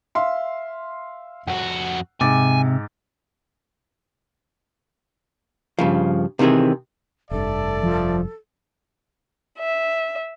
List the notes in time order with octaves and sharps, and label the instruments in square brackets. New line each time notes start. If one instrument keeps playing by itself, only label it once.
[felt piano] E5 F5 C6
[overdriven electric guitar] F2 F#4 [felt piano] F#5
[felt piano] G#2 D6 A6 [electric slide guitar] C3 [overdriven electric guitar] G#5
[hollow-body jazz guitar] G2 C#3 F3
C3 D#3 E3 C4 G#4
[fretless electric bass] F1 G2 [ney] A4 [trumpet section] D5 E5 A5
[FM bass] F3
[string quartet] E5